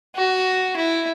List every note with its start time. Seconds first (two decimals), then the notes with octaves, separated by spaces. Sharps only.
0.15 F#4
0.76 E4